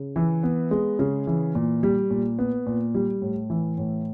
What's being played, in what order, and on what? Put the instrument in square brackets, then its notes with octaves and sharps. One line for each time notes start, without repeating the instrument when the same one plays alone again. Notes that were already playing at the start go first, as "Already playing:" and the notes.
Already playing: [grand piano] C#3
E3
B3
G#3
C#3
E3
A#2
G3
A#2
B3
A#2
G3
A2
E3
A2